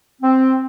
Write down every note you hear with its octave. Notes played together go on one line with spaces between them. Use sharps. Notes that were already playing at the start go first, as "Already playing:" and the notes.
C4